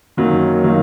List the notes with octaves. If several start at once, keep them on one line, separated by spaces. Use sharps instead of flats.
F#2 D#3 F#3 A#3
D#3 F#3 A#3